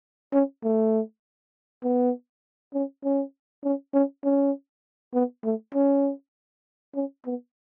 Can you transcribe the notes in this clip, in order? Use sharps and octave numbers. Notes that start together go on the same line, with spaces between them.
C#4
A3
B3
C#4
C#4
C#4
C#4
C#4
B3
A3
C#4
C#4
B3